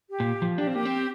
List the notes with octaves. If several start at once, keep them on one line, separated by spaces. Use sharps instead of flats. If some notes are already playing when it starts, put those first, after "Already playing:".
G4
A#2
F3
D4 G4
C4 F4
A#3 G4
C4